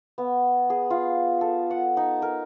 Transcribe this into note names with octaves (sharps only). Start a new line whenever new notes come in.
B3
G#4
F4
A4
F#5
D#4
A#4